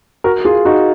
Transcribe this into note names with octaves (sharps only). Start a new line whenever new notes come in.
F#4 A#4
F4 G#4
D#4 F#4